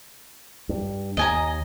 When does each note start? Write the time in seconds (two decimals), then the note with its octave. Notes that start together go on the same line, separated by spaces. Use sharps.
0.69 G2
1.17 D#2 D#5 G#5 A#5